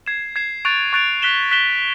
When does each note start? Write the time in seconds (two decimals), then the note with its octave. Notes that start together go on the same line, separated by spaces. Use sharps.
0.06 G#6 C7 E7
0.36 G#6 C7 E7
0.65 C#6 F#6 A6 D7 F7
0.93 C#6 F#6 A6 D7 F7
1.22 F#6 B6 E7 G7
1.51 F#6 B6 E7 G7